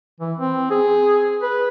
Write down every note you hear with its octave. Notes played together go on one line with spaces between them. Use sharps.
E3
C4
G#4
B4